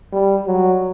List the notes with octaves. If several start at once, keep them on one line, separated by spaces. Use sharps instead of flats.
G3
F#3